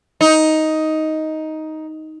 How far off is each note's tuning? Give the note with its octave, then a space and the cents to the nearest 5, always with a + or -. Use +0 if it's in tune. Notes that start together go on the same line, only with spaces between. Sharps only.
D#4 +10